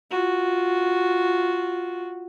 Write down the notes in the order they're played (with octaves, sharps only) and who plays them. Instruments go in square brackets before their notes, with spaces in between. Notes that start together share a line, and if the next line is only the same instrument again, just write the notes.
[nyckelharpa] F4 F#4